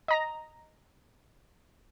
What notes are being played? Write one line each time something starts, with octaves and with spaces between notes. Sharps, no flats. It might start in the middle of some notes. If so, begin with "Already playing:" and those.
D#5 A#5 A#6